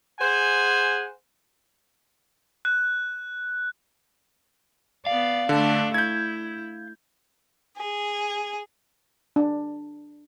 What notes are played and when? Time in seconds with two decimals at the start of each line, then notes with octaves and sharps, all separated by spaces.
0.19 G#4 C5 F#5 G#5
2.65 F#6
5.06 B3 D5 F5
5.49 D3 A3 D4
5.94 E4 G6 G#6
7.79 G#4
9.36 D4